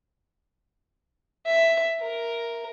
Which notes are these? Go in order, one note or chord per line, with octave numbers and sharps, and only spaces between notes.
E5
A#4